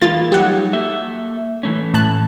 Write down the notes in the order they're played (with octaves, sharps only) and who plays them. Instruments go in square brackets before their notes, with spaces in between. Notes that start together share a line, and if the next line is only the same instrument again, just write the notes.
[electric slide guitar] E3 G#3 A#3 [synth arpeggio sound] F4 A6
[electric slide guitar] F#3 G3 D#4 [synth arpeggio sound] G4 F#5
[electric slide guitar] A#3 A4 E5
E3 A3 C#4
[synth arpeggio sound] A2 A5 F#6